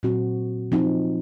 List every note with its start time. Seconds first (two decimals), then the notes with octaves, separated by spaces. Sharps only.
0.03 A#2 F#3 C4 F#4
0.72 F3 C4 D#4